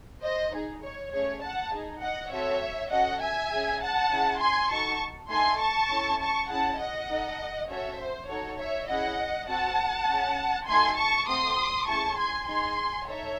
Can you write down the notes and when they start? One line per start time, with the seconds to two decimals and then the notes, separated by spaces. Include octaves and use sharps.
0.22 C5 D#5
0.52 D#4 G#4
0.82 C#5
1.11 A3 C#4 G#4 C#5
1.41 F#5 A5
1.72 D#4 G#4
2.01 D#5 F#5
2.30 C4 F#4 A4 C#5 E5
2.91 C#4 F#4 A4 D#5 F#5
3.21 E5 G#5
3.51 C#4 G#4
3.81 F#5 A5
4.11 C#4 E4 G#4
4.39 G#5 C6
4.70 D#4 F#4 A4 A5 C#6
5.30 A3 D#4 A4 G#5 C6
5.59 A5 C#6
5.90 C#4 E4 A4
6.19 A5 C#6
6.49 C#4 E4 G#4 F#5 A5
6.79 D#5 F#5
7.09 D#4 A4
7.68 C#4 F#4 A4 C#5 E5
7.98 C5
8.28 D#4 F#4 A4 C#5
8.58 C#5 E5
8.88 C#4 E4 G#4 D#5 F#5
9.47 C4 F#4 A4 F#5 A5
10.07 C#4 G#4
10.67 A3 D#4 F#4 A4 G#5 C6
10.97 A5 C#6
11.26 A3 C4 F#4 A4 C6 D#6
11.86 A3 C#4 E4 G#4 A5 C#6
12.16 G#5 C6
12.46 D#4 G#4 G#5 C6
13.06 D#4 A4 C#5 E5